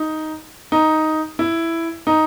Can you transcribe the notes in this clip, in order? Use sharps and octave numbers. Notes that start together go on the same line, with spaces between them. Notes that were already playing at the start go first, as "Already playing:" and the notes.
Already playing: D#4
D#4
E4
D#4